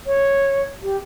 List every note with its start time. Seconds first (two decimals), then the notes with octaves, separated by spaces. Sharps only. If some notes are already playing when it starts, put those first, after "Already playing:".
0.07 C#5
0.83 G4